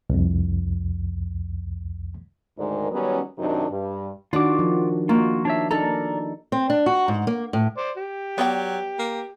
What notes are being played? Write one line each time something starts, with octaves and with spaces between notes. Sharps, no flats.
C2 F2
D2 G#2 D#3 G#3 A#4 D5
D#3 F#3 G3 B3 C#4
F#2 C3 D#3 F#3 D4 D#4
G2
D#3 D4 F4 F#4 D6
F3
A#3 D#4 F4 F#4
D4 C#5 E5
D4 D#4 A4 A#4 D5 A#5
C4
D4
F#4
G#2
A#3
A2
C5 D5
G4
F#3 B3 D5 G5
A#3